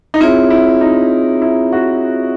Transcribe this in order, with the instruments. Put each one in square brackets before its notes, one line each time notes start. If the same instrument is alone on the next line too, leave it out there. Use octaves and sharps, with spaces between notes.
[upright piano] D#4
[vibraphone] C4 F4 G#4 C#5 [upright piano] E4
[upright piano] E4
D#4
E4
F#4